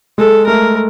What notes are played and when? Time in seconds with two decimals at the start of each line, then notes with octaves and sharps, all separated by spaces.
0.18 G#3 A4
0.47 A3 A#4